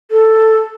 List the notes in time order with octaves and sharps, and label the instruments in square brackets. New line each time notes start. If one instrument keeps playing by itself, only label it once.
[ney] A4